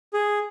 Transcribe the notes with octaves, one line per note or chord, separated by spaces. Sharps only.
G#4